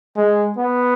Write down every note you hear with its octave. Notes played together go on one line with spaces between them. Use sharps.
G#3
B3